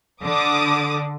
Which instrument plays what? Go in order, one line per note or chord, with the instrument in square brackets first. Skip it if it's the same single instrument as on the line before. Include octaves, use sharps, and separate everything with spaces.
[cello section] D3 [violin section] D6 D#6